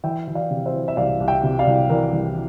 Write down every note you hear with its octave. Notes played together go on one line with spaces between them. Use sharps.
E3 E5 G5
E3
D5 F5
C3
C5 E5
E3
E5
C2 D5 F5
C2
E5 G5
C3
D5 F5
C2
E3 A#4 D5
C2